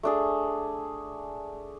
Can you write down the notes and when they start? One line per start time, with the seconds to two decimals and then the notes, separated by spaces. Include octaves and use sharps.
0.03 A3 D4 G#4